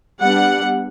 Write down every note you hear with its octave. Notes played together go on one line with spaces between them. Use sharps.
G3 B3 D4 F#5